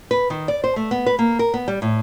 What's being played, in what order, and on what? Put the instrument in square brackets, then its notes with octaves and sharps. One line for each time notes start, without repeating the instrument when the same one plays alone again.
[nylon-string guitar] B4
D#3
D5
C5
A3
B3
B4
A#3
A#4
B3
G3
A2